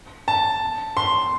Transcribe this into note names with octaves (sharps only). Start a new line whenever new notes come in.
A5
C6